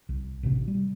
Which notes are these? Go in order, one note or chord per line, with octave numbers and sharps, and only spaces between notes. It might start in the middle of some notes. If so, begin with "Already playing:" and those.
C2
A1 C3
G3